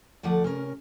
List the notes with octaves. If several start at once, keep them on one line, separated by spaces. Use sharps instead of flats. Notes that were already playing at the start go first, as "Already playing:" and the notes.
D2 F3 A3 D5 F#5
C3 C#4 A#4